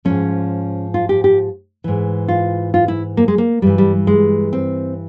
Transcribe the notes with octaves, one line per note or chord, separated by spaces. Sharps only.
G#2 F3 C#4
F4
G4
G4
G#2 E3
F4
F4
E4
A#3
G#3
A#3
G2 E3 G3
G3
G#3
C4